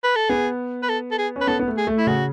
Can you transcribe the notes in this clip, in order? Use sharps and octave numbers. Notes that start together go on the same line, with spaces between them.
B4
A4
B3 G#4
B4
A4
A4
G#4
C#4
B4
B3 A4
B3
A3
G#4
A3
E4
C#3 F#4